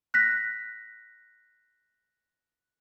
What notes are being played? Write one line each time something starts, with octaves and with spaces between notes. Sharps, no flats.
F#6 A#6 B6